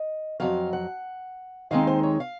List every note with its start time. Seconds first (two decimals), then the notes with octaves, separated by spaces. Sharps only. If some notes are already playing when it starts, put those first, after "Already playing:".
Already playing: D#5
0.40 F2 C#3 F#3 F5
0.73 F#5
1.71 D#2 D#3 G#3 C4 D#4 F5
1.87 C5
2.03 C#5
2.20 F5